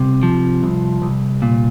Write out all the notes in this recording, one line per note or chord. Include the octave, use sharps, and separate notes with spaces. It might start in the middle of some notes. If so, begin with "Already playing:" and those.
Already playing: C2 C3
F3
C2
C2
A#2